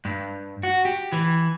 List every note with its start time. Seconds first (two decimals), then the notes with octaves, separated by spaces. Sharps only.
0.05 G2
0.63 F#4
0.85 G4
1.12 E3